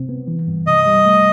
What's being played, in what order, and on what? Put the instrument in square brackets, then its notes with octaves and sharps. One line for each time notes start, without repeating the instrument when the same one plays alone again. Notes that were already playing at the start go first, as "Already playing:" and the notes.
Already playing: [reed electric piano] C3 C4
B3
E3
G2
[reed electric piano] C3 [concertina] D#5
[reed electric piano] G3
A3